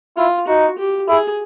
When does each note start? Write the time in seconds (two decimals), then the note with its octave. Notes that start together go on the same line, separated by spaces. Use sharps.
0.17 E4 F4
0.47 D#4 F#4
0.78 G4
1.08 E4 G#4